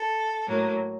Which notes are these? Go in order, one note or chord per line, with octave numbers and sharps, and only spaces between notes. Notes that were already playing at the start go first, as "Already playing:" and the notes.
Already playing: A4
A2 F#3 A#3